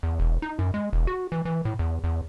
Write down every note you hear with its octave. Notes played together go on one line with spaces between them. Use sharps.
E2
E1
D#4
F#2
G#3
E1
F#4
E3
E3
A2
E2
E2